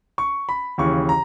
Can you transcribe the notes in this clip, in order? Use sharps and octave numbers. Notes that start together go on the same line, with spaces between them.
C#6
B5
D#2 C#3 E3 C#6
A#5